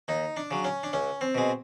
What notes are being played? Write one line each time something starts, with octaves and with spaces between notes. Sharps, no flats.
D#2 D#4
D4
C#3 F#3
C#4
D4
C#2 C#4
C4
B2 G#3